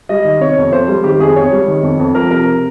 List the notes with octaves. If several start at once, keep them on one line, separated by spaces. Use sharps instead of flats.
G3 D#5
D#3
C3 C#5
F2
F2 C5
G3
D#3 G4
F2 G#4
F2 C#5
G3
D#3
F2
F2
F3 A#4
C3 A#4